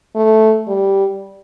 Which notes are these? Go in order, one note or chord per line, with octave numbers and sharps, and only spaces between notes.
A3
G3